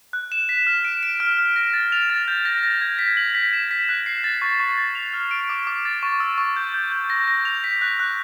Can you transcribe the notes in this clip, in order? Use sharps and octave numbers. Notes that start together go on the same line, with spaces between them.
F#6
E7
B6
F6
D7
D7
F6
F6
A#6
A6
F7
A6
G6
A#6
A#6
G#6
B6
F#7
B6
E7
B6
F#6
C7
A6
C#6
C#6
A6
F7
F6
D7
D6
D6
A6
C#6
E6
C#6
G6
G6
G6
A#6
A#6
F7
B6
F#6
F#6